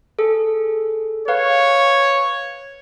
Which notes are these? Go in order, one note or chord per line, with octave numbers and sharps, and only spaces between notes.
G#4 A4
B4 C#5 F5